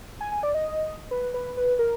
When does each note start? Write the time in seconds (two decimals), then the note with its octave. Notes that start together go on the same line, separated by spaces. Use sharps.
0.21 G#5
0.32 G#5
0.43 D5
0.54 D#5
1.11 B4
1.34 B4
1.57 B4
1.79 A#4